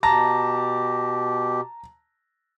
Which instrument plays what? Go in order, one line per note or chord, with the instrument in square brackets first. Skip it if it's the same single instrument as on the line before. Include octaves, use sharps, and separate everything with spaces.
[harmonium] B2 G4 [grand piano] A5 A#5 A#6